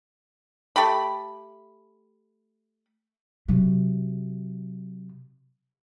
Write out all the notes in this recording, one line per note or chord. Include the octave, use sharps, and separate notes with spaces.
A3 G4 B5
C3 F#3